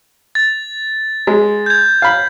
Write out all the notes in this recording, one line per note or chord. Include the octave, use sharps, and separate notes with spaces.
A6
G#3
G6 G#6
F5 B5